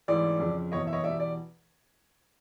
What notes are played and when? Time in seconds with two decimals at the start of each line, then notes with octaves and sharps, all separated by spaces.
0.08 A1 G#2 E3 D5
0.40 F2 C#3 F3
0.72 F#1 E2 B2 C#5 D#5
0.87 E5
0.93 C#5 D#5
1.04 E2 B2 G3 D5 E5
1.20 D5